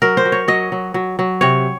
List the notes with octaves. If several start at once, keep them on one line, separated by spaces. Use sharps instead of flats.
F#3 A#4
C5
F#3
C#5
F#3 D#5
F#3
F#3
F#3
C3 C#5